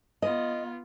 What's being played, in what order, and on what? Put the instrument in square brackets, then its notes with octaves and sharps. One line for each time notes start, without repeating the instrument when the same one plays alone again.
[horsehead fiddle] B3 F4 [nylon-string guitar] D#5